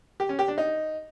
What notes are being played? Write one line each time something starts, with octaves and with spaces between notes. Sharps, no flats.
G4
C#4
G4
D4
D#4